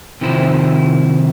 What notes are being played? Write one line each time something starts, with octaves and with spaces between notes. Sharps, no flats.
C3 D#3 F3 E4 C5